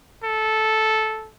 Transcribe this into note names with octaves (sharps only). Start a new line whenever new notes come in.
A4